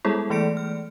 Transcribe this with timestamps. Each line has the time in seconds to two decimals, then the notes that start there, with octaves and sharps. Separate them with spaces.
0.05 G3 G#3 B3 E4 G#4 A4
0.30 E3 A3 D5 C#7 D7
0.57 F6